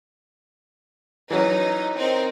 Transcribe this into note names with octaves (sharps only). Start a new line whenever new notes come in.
E3 F#3 C#4 D#4
C4 D#4 A#4